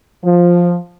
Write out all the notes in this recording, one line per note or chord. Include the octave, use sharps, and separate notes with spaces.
F3